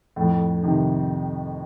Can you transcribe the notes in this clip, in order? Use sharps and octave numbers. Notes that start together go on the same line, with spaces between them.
F2 A2
C3 D#3